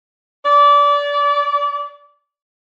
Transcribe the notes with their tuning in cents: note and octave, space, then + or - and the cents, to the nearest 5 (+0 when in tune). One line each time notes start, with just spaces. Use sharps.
D5 -25